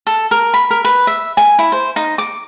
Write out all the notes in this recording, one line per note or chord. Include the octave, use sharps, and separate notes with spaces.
A4
A#4
B5
A#4
B4
E5
G#5
E4
C5
D#4
D6